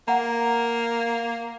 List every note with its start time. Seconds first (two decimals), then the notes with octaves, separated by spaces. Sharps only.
0.08 A#3 F#5 A#5